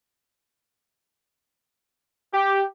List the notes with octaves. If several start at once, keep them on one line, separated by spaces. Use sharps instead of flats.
G4